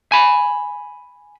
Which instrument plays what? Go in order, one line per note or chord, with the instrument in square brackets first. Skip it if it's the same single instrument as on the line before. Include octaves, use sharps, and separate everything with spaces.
[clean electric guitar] G#5 B5